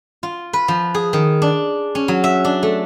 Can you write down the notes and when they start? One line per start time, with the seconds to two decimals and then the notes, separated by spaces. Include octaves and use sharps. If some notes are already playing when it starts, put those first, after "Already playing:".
0.23 F4
0.53 B4
0.68 F3
0.94 G#4
1.13 D#3
1.42 D4
1.95 C#4
2.08 F#3
2.24 E5
2.45 D4
2.63 A3